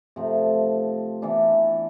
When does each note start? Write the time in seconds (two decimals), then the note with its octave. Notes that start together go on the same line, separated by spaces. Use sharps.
0.16 C3 F3 A3
1.22 E3 B3 D4